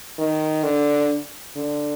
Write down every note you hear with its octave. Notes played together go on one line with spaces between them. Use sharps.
D#3
D3
D3